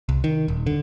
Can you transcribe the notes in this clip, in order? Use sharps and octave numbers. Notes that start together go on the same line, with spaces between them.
C2
D#3
D#1
D3